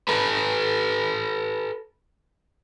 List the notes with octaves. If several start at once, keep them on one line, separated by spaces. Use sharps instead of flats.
A4 B4